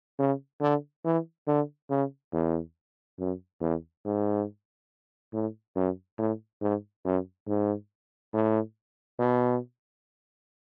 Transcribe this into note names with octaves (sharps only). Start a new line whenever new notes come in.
C#3
D3
E3
D3
C#3
E2
F#2
E2
G#2
A2
F#2
A2
G#2
F#2
G#2
A2
B2